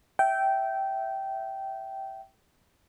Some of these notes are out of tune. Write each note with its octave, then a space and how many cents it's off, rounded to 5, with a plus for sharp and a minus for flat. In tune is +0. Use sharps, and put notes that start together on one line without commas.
E5 +0 G5 -15